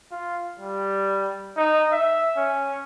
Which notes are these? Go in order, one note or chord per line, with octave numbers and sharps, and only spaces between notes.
F4
G3
D#4
E5
C#4